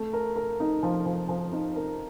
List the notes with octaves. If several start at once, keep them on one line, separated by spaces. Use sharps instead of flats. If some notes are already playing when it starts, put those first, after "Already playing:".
Already playing: A3
A#4
A#4
D#4
F3
F3
F3
D#4
A#4